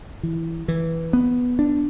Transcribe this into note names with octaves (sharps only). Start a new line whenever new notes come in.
E3
E3
B3
D4